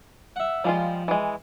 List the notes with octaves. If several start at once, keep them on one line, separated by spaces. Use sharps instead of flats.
E5 F#5
F3 G3 G#3 F4
E3 G#3